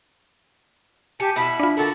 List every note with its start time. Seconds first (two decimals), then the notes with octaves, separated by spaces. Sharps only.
1.20 G4 G#5 A5 C#7
1.36 B2 E4 B5
1.60 D4 F4
1.77 D3 F#4 A4 A#4